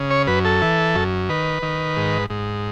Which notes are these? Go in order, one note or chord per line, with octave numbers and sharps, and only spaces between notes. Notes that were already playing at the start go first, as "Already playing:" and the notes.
Already playing: C#3
C#5
F#2 B4
A4
E3
F#2
D#3 B4
D#3
G#2
G#2